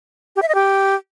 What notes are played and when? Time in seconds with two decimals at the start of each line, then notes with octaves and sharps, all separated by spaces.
0.36 G4
0.42 E5
0.48 D#5
0.55 G4